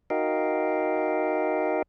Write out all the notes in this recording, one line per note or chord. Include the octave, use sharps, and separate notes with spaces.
D#4 F#4 A#4 D#5 F5 G5